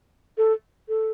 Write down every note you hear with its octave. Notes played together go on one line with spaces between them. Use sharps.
A4
A4